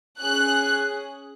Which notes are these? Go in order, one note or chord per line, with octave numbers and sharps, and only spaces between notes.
C#4 G#4 F#6